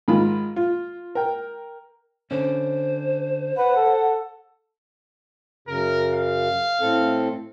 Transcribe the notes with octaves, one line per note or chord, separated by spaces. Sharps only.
G#2 D#3 F4 B5
F4
A#4 G5
D3 C#4 C5
B4 F#5
A4
F#2 C#3 A#4
F5
A2 C4 A4